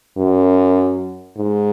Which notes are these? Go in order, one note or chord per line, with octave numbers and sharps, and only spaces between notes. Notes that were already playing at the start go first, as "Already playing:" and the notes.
F#2
G#2